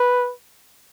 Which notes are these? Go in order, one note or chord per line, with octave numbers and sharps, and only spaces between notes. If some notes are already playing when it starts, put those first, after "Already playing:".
Already playing: B4